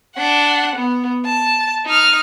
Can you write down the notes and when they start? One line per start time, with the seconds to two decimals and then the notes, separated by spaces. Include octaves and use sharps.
0.16 D4 F#5
0.76 B3
1.25 A5
1.86 D#4 F6